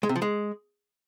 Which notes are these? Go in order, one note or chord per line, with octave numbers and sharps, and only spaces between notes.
G#3
C3
F3
G#3